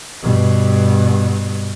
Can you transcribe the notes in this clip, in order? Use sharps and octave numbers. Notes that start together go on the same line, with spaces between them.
G2 B2